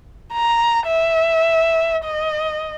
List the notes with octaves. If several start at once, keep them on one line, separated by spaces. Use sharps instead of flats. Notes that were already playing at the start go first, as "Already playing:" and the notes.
A#5
E5
D#5